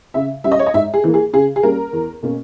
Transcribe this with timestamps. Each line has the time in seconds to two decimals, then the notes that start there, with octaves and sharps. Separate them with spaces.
0.14 C#3 E5
0.44 G3 C#4 E5
0.52 D#5
0.59 C#5
0.66 D#5
0.74 G#2 E5
0.94 G#4
1.04 E3 A#3
1.14 G#4
1.33 C#3 G#4
1.56 G#4
1.63 G3 A#3 C#4 A#4
1.93 E2
2.23 B2 A#3 C#4